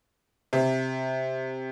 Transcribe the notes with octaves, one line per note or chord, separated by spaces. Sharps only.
C3